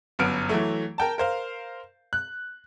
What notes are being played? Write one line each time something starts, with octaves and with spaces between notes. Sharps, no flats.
G1 F#2 B3 F6 D7
E3 F#3 A3
A#4 G5 A5
A#4 C5 F5
F#6